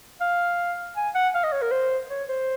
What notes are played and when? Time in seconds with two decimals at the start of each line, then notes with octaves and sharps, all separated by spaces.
0.21 F5
0.96 G#5
1.15 F#5
1.35 F5
1.44 D#5
1.52 C#5
1.62 A#4
1.71 C5
2.10 C#5
2.29 C5